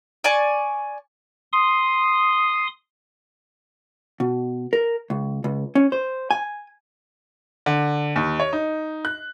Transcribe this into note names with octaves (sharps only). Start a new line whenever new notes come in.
D5 G#5 C#6
C6 D#6
B2
A#4
C#2
C#2
C#4
C5
G#5
D3
D#2
C#5
D#4
F#6